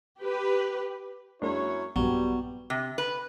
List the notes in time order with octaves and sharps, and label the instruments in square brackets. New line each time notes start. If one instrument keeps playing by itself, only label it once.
[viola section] G4 B4
[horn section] F#2 E4 C#5 [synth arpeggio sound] G#3 A#3 D4
[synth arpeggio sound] A#1 G2 [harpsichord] F#3 [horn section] G3 [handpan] B3
[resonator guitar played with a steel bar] C3
B4